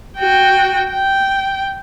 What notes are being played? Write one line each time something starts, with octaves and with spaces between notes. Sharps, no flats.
F#4 G5
G5